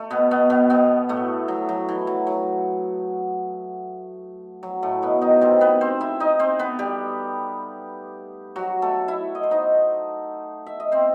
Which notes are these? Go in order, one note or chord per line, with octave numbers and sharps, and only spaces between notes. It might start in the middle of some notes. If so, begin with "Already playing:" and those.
Already playing: A3
B2 B3
B2 B3
B2 B3
B2 B3
A2 A3
F#3
F#3
E3
F#3
F#3
F#3
A2 A3
B2 B3
D#3 D#4
C3 C4
B3 B4
C4 C5
E4 E5
D#4 D#5
C4 C5
B3 B4
G3 G4
F#3 F#4
A3 A4
E4 E5
D#5
C5
D#4 D#5
E5
D#5
C4 C5